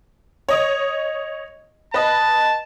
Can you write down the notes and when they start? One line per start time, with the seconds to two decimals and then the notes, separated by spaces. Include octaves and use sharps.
0.49 C#5 D#5 D#6
1.94 B4 D#5 A5